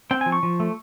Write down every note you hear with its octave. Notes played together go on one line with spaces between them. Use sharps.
C4 G5
G#5
F3
C#6
F3
A3